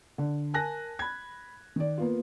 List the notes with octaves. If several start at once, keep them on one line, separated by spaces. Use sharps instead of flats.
D3
A#4 G#5 A5 F#6 A#6
B5 G#6
D#3 D5
A#3 B3 F4